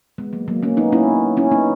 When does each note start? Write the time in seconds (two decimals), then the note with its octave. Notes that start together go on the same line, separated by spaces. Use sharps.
0.18 G#3 B3
0.33 F#3 A#3
0.48 F#3 A#3
0.63 A#3 C#4
0.77 B3 D#4
0.93 C#4 E4
1.37 C#4 E4
1.51 B3 D#4